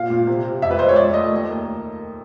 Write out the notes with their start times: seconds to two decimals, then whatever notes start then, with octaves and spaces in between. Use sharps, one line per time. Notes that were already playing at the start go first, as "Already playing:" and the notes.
Already playing: A#2 F5
0.10 A#2
0.27 C3
0.45 C3
0.62 F2 E5
0.71 B4
0.79 G#3 C5
0.89 C#5
0.96 F2 D5
1.14 A3 D#5
1.31 D#2
1.49 A#3